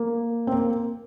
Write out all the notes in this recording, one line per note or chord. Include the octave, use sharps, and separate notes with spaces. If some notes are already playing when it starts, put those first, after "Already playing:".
Already playing: A#3
C4
A#3